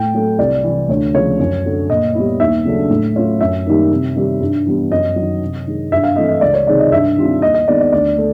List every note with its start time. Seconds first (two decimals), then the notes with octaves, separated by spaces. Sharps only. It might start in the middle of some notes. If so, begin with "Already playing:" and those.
Already playing: A2 G5
0.14 F#3 A3
0.38 C2 D5
0.63 C3 E3
0.89 D2 C#5
1.14 C#3 F3 G#3 C#4 C#5
1.39 F#2
1.65 D3 F#3 A3
1.90 A#2 D#5
2.15 G3 B3 E4
2.40 D#2 E5
2.65 C#3 F#3 A3 D4
2.90 A2
3.16 F#3 A3 C#4 F4
3.41 F#2 E5
3.66 D#3 G3 A#3 D#4
3.91 C3
4.15 D#3 G3 C4 D#4
4.41 G2
4.66 E3 G3 B3
4.91 F#2 D#5
5.16 D#3 F#3
5.42 C3
5.67 D#3 G#3
5.92 G2 E5
6.04 F5
6.16 E3 A3 C4 D#5
6.29 D#5
6.41 C#2 D5
6.54 C#5
6.67 C3 D#3 G#3 D5
6.79 D#5
6.92 G2 E5
7.17 D#3 G3 C4 F4
7.42 D#2 D#5
7.54 D#5
7.68 D#3 G#3 B3 D5
7.81 D5
7.92 D2 D5
8.18 A3